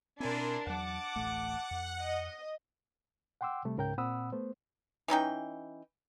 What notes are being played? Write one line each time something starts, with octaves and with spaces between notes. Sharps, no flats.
B2 C4 D4 E4 A#4 D5 G#5 C6
E2 F#3 F#5 A5 D6
D1 A1 A3
F2
D#5
F#5 G5 C6 D6 E6
C3 G3 A3
C#2 G#2 C#3 A#4 G5 G6
A#2 C4 F#5 B5 D#6 E6
A3 B3 C5
E3 C#4 D#4 G5